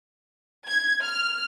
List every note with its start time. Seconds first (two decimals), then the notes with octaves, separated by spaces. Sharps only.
0.66 G#6
1.02 F6